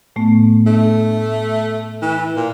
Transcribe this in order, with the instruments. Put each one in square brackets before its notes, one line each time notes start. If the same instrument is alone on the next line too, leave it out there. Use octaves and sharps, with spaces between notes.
[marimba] A2 A3 B3
[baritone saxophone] A3 [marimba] D4
[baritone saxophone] E3
A#2